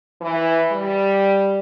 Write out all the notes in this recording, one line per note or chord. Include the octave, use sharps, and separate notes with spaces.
E3
G3